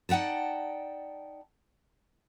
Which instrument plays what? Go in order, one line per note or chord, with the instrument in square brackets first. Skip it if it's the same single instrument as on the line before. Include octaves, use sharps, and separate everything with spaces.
[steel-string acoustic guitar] D#4 D5 F#5 G5 A5